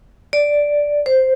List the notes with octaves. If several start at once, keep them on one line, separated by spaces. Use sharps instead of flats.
D5
C5